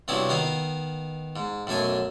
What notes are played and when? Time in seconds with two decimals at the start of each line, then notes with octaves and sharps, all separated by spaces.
0.08 G2 C3 B3 C#4 E4 F#4
0.29 D#3 B3 D#5 F5 B5
1.36 G#2
1.67 B1 F#2 A3 A4 G#5